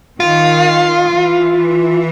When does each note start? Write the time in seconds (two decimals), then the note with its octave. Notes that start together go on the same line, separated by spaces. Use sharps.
0.20 D#3 F4
1.12 E3